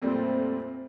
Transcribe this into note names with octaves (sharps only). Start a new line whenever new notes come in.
F2 A#2 G3 A3 C4